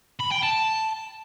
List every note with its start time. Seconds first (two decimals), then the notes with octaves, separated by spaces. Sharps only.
0.20 B5
0.31 G5
0.43 A5